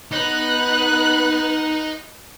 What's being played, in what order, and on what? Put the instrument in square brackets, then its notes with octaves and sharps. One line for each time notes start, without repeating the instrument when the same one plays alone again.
[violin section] B3 F#6 [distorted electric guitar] D#4